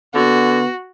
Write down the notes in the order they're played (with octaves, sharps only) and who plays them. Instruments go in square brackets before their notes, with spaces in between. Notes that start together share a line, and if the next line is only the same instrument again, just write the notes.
[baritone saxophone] D3 [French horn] B3 [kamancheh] F#4